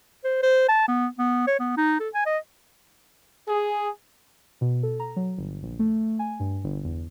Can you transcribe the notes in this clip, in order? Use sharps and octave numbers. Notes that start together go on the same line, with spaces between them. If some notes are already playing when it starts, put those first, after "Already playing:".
C5
C5
A5
B3
B3
C#5
B3
D#4
A4
G#5
D#5
G#4
B2
A4
A#5
F#3
G1
A#1
A3
G#5
G2
G1
E2